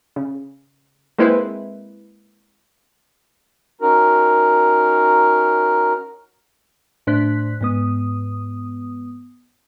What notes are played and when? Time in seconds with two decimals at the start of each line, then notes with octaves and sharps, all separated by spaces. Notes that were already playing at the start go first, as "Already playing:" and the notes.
0.16 C#3
1.18 G#3 A#3 C4 E4 B4 C5
3.81 C#4 D#4 F#4 A#4
7.07 A2 D4 C5 F#6 B6
7.61 G#2 B3 D#6